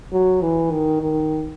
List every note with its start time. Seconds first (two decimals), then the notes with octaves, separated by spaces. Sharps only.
0.12 F#3
0.41 E3
0.71 D#3
1.01 D#3